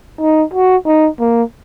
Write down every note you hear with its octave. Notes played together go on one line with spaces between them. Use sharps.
D#4
F#4
D#4
A#3